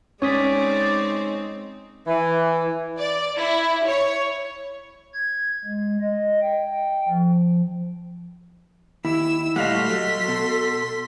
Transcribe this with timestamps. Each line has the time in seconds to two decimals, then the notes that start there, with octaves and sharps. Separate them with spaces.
0.22 G#3 C4 C#4 D#4 C#5 D5 D#6 B6
2.07 E3
3.00 D5
3.38 E4
3.87 C#5
5.14 G#6
5.65 G#3
6.02 D#5
6.42 G5
7.08 F3
9.05 D#2 E4 E6
9.56 A#2 G3 A3 D#5 F5 F#5 C6 B6
9.89 F#3 A4
10.28 B2